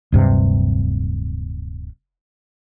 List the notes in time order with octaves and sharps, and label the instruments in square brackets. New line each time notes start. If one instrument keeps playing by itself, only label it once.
[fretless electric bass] D1 G2 C3